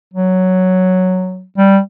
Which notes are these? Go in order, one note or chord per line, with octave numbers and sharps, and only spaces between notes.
F#3
G3